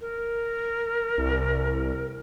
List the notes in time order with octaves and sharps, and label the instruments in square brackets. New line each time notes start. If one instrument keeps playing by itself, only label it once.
[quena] A#4
[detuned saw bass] C2